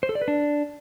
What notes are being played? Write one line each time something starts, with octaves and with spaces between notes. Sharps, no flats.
C5
A4
D5
B4
D4